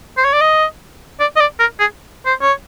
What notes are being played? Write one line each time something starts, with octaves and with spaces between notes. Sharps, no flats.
C5
C#5
D5
D#5
D5
D#5
D5
A#4
G#4
C5
C#5